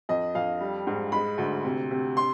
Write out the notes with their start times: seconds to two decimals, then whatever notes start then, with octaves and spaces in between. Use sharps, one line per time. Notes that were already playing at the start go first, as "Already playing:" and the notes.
0.09 F2 D#5
0.35 F2 F5
0.61 G3
0.87 G#2
1.12 G#3 B5
1.38 D2
1.65 C3
1.91 C3
2.17 C6